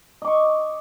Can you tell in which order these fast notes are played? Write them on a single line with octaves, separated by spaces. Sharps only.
D#5 D6 C#6